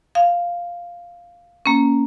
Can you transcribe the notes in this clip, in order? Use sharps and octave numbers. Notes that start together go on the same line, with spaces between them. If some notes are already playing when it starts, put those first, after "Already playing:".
F5
A#3 C#4